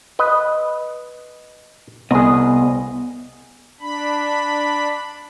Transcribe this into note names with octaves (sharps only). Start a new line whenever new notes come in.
B4 D#5
C2 B3 G#4 D#5
D4 B5